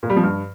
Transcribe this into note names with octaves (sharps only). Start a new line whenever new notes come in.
A#2
G3
F3
G2